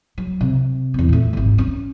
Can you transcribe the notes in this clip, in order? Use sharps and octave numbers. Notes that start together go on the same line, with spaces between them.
F#3
C3
E2 C4
A#2 A3
G#1 D#2
C#4